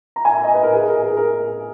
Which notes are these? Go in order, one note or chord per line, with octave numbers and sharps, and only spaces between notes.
A#5
G#5
E5
D#5
B4
A#4
G#4
A#4
G#4
A#4